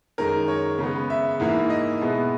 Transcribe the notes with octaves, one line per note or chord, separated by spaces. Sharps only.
F#2 D#3 G#3 A#4
C#5
C#3 G#3 B3
E5
G#2 E3 A#3 E4
D#5
B2 G#3 B3 E4